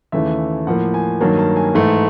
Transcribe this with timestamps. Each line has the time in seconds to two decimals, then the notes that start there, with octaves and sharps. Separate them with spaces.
0.12 D#2 C#3 E3 A3 E5
0.67 A2 F3 A#3 F#5
0.94 G#5
1.21 G2 D#3 F#3 A#3 A5
1.39 A5
1.56 G#5
1.75 G#2 E3 A3